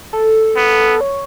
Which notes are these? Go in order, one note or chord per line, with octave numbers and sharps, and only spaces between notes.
A4
B3
C#5